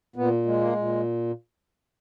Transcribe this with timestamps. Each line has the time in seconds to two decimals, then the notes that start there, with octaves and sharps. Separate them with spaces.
0.16 A#2 B3
0.46 G#3
0.60 A#3
0.76 A#2